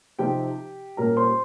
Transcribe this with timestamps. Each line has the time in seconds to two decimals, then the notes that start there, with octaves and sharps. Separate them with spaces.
0.19 C3 F3 C4 D#4 G4 G5
0.97 A#2 G3 C#4 A#4 A#5
1.17 C5 C6